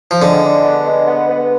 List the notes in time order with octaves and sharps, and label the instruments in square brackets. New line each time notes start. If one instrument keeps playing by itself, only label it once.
[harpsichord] F3
[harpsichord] D3 [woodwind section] G#3
[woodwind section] D4
B3
G#3
B3
B3